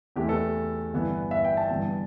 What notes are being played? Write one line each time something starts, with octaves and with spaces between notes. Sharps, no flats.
E2 E3 A3 G4
A4
G1 G2 E3 B3
E5
G5
A5
G1 G2 E3 B3 A5